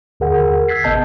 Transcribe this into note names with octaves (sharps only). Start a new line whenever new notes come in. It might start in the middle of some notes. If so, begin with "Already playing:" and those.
D#2 D3 G#4 A#4 F#5
E6 F#6 G#6 A6 B6 C7
G#1 C3 B3 D#5 A5 G6